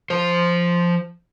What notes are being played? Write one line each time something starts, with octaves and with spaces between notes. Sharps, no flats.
F3 C5